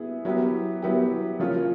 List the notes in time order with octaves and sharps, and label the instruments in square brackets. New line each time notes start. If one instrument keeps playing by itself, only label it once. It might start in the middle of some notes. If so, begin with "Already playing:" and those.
Already playing: [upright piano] B3 E4 G#4
F#3 B3 E4 G4
F#3 B3 E4 G4
C#3 F3 A#3 C#4 F4